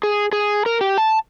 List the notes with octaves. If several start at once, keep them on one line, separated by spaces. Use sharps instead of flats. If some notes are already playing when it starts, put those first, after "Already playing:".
G#4
G#4
A#4
G4
A5